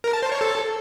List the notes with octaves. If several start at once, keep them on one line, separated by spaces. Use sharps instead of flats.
A#4
A5
C5
C#5
A4